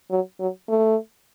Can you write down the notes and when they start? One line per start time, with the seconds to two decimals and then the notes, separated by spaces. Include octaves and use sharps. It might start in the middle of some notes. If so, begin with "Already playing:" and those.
0.11 F#3
0.40 F#3
0.69 A3